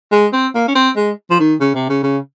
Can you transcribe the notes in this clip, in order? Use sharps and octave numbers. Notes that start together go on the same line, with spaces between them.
G#3
C4
A#3
C#4
C4
G#3
F3
D#3
C#3
C3
C#3
C#3